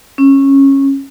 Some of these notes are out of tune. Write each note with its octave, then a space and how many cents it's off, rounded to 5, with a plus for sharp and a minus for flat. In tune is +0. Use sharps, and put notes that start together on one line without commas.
C#4 -15